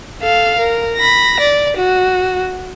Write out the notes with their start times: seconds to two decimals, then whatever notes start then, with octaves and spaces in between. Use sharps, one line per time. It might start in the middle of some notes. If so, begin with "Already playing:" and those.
0.22 A4 F5
0.59 A#4
0.96 B5 A#6
1.40 D5
1.77 F#4